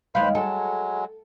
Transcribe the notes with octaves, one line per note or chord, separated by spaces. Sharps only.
D#2 G#3 B4 C5 F5 B5
F#3 G#3 A4